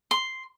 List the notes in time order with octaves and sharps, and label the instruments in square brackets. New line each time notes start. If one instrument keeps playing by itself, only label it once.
[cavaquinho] C6